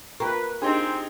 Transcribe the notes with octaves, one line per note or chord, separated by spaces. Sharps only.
A#3 F4 B4 G5 C#6
C4 D4 D#4 G4 G#4 C6